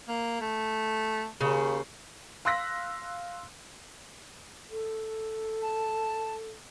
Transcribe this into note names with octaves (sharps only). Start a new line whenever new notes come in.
A#3
A3
D#2 C#3
F5 C6 E6 F#6 A#6 B6
A4
A5